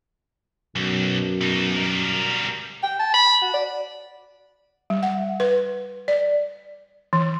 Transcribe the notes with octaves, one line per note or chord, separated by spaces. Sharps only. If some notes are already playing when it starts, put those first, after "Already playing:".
B1 F#2
B2 D#4
G3 A#4
G5
A5
B5
F#4
D5
G3
F#5
B4
D5
E3